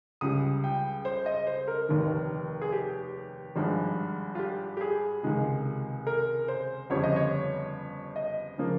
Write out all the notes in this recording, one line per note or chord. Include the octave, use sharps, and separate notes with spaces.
C#2 C#3 G3 D#6
G5
C5
D#5
C5
A#4
F1 D#2 D#3
G#4
G4
G#1 G2 F3 G#3
F4
G4
G4
G#4
C#2 C3 D#3 G#3
A#4
C5
G1 F2 C#3 G3 C4 C#5
D#5
C#5
D#5
C#3 F3 A#3